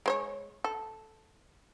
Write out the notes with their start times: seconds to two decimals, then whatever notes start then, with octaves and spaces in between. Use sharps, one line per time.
0.06 G#3 C5 C#5
0.64 A4